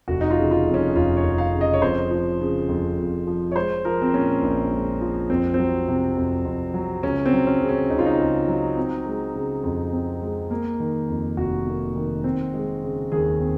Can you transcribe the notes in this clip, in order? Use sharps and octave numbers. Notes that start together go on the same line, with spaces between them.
F1 F#4
D#4
F4
C#3
F4
F2
C#4
F1 F4
C#5
F1
F5
C#3
D#5
C#5
F2 C5
F3
C#3
F2
F2
F3
C#5
G#3 C5
F3 A#4
C4
A#2 C#4
A#1
G#3
F3
F2 C4
F#3 C4
C3
F2
F2
F#3
C#2 C#4
C4
F#3
C#4
C#3
C#4
C#2 D#4
F4
D#4
C#2
F#3
C4
G#3
C#3
F2
C4
G#3
A#3
D#3
F2
F1 F#4
A#3
D#3
C4
G#3
C#3
D#2 G#4
C4